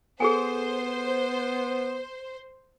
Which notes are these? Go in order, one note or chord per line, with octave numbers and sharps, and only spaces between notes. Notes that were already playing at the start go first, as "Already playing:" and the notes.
B3 G#4 A4 C5 G#5